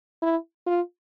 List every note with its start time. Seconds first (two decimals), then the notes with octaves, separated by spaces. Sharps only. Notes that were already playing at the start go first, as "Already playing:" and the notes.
0.22 E4
0.67 F4